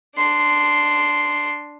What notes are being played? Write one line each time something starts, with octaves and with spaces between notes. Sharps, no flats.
D4 C6